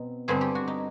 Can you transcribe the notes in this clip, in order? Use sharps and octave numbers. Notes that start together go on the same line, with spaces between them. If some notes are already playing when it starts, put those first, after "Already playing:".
Already playing: B2 C4 D#4
G2 D3 G3 C4 G#4
G4
F#4
D#4